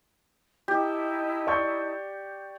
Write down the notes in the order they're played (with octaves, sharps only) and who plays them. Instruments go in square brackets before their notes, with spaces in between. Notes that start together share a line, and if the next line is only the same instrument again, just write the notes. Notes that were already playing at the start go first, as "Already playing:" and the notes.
[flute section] D#4 E4 A5 [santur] G4
[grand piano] D5 C#6 G6